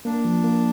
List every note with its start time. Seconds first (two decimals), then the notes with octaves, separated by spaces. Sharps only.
0.05 A#3 D4
0.25 F3
0.44 A#3